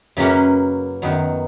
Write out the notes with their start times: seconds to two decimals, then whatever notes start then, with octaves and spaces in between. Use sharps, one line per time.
0.17 F#2 C#3 F#3 A#3 C#4 B4
1.02 F#2 D#3 F#3 B3